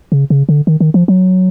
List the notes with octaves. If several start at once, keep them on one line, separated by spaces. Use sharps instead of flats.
C#3
C#3
D3
D#3
D#3
F3
F#3